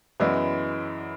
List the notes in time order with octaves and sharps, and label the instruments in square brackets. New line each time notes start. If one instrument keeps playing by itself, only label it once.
[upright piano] F#2 E3 G#3 B3 E4